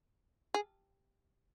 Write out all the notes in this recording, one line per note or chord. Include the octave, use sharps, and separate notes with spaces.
G#4